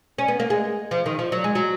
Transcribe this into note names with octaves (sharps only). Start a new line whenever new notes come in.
C#4
B3
A#3
G#3
F3
D#3
F3
F#3
G#3
F#3